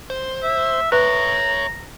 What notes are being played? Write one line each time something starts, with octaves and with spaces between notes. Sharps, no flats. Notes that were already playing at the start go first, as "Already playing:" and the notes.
C5
E5
B4 C#5 E5 A#5